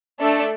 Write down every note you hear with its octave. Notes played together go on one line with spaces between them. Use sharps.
A3 D4 A4 D5